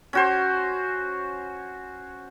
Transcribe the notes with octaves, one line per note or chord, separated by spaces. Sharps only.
C#4 F#4 C5